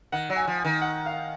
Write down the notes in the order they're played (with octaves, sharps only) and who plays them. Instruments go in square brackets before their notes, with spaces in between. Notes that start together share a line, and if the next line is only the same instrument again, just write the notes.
[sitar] D#3 [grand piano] F#5
[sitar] F#3
[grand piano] G#5
[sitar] F3
[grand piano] G#5
[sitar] D#3
[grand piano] F#5
F5